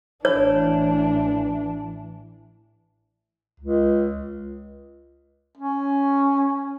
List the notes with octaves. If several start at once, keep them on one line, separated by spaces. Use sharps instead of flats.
A1 E3 D4 C#5
C#2
C#4